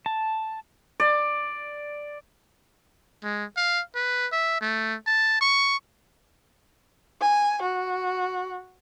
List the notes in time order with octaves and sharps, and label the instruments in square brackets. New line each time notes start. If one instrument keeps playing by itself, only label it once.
[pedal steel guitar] A5
[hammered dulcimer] D5
[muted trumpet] G#3
F5
B4
E5
A3
A5
C#6
[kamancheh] G#5
F#4